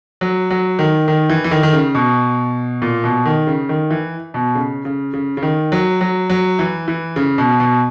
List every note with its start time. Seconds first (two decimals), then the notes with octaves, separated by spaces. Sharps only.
0.21 F#3
0.50 F#3
0.79 D#3
1.08 D#3
1.29 E3
1.44 E3
1.51 D#3
1.63 D#3
1.73 C#3
1.95 B2
2.82 A#2
3.04 B2
3.25 D#3
3.47 C#3
3.69 D#3
3.91 E3
4.34 B2
4.55 C#3
4.85 C#3
5.14 C#3
5.37 C#3
5.43 D#3
5.72 F#3
6.01 F#3
6.30 F#3
6.59 E3
6.88 E3
7.16 C#3
7.38 B2
7.60 B2